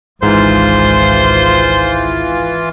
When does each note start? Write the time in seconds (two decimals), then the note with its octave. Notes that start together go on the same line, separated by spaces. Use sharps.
0.23 G#1 C#2 G#2 E3 F4 C5